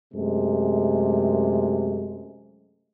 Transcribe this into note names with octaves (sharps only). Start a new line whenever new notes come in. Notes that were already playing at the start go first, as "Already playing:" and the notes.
F#2 C3 G#3 A3